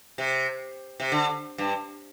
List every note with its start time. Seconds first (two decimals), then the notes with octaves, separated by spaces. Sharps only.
0.18 C3
1.00 C3
1.12 D3
1.58 G2